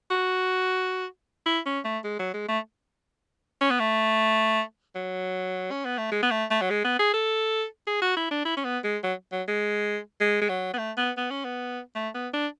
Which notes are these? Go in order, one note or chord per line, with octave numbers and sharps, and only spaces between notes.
F#4
E4
C#4
A3
G#3
F#3
G#3
A3
C#4
B3
A3
F#3
C#4
B3
A3
G#3
B3
A3
A3
F#3
G#3
B3
G#4
A4
G#4
F#4
E4
D4
E4
C#4
B3
G#3
F#3
F#3
G#3
G#3
G#3
F#3
B3
A3
B3
B3
C#4
B3
A3
B3
D4